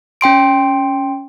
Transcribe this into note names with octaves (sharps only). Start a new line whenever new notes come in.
C#4 G5 C6 D7